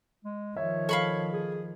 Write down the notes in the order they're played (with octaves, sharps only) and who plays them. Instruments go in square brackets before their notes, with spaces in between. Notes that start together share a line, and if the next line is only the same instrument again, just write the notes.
[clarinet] G#3
[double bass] D#3 F3 [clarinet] C#5 [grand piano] E5
[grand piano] A4 [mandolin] F5 B5 C#6
[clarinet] G#4